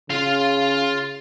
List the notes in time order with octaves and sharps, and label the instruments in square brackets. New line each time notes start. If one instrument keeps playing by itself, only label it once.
[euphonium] C#3 [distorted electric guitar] F4 F5